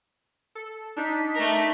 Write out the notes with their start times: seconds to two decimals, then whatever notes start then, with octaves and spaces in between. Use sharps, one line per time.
0.55 A4
0.96 D4 D#4 B6
1.34 A3 A#4